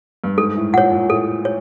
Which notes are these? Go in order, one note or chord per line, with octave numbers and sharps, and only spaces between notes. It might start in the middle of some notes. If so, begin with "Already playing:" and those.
G2
G#2 A4
A2
A#2 C#5 F#5
A#2
A2 A4
C#5